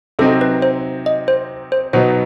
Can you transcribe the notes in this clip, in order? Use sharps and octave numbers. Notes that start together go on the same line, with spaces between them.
C3 F#3 C4 D#4 A4
B4
C5
D#5
C5
C5
B2 F#3 B3 D#4 C5